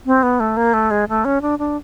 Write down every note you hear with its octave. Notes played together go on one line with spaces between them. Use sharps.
C4
B3
A3
A#3
A3
G#3
A3
C#4
D4
D4